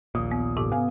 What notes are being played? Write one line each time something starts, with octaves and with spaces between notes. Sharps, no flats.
A#1 D#2 A#2 D#6
B3
G#2 C3 G4 D6
B3 F5 G#5